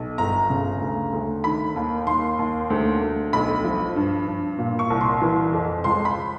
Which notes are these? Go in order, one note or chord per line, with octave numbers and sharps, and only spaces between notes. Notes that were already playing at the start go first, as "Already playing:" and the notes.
Already playing: B1
G1 A#5
C#3
D2
D2
D#3 B5
D#2
D#2 C6
D#2
D2
D2
B1 B5
F3
G2
G2
A#2
C#6
C2
C6
E3
F2
C#2 C6
B5